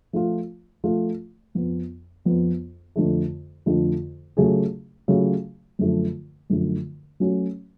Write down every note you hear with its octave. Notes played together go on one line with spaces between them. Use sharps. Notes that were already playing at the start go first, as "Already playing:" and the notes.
F3 A3 F4
F3 A3 F4
F2 F3 B3
F2 F3 B3
F2 D3 F3 A3
F2 D3 F3 A3
C#3 F#3 A3 F4 G#4
C#3 F#3 A3 F4 G#4
F#2 D3 F3 A3
F#2 D3 F3 A3
F#3 A3 C#4 F#4